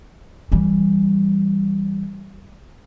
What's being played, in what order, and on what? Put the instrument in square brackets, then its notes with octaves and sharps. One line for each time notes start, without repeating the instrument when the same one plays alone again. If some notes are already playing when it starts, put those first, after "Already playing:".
[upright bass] E3 G3